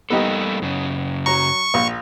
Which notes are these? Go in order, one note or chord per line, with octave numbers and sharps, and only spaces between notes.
G3 A#3 B3 D#4 G4 A4
F#2 C#3
F#3 A#5 C#6
A#1